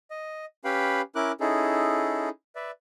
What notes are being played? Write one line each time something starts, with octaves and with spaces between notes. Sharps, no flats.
D#5
C#4 G4 B4 F5 G5 B5
C#4 E4 A#4 D6 F#6
C#4 D#4 E4 G#4 A4
B4 D5 E5